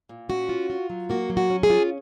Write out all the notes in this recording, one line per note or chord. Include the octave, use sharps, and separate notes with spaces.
A#2
C#4 F#4
F4
F4
F#3
A#3 F#4
F#3
F#4
C#4
G#4
F4